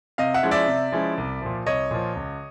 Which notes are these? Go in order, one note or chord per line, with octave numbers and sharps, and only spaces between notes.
C3 D#5 F5
E5 F#5
F3 G#3 C#4 E4
D5 E5
C3
F3 G#3 C#4 E4
C2
A#2 F3
C2 C#5 D#5
A#2 F3
C#2